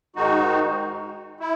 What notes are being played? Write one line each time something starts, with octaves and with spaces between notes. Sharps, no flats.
G#2 D#3 G#3 D#4 F#4
E4